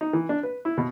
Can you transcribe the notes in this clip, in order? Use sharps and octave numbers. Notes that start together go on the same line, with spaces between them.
D#4
E3
D4
B4
E4
B2